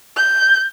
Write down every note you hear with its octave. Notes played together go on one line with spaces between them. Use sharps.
G6